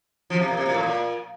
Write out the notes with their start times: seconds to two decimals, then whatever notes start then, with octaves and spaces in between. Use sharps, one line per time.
0.30 F3
0.39 C3
0.48 A#2
0.57 C3
0.66 A#2
0.74 A2
0.83 A#2